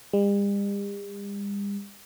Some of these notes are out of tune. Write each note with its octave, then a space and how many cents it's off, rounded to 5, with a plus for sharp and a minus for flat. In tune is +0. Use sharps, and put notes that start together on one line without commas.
G3 +45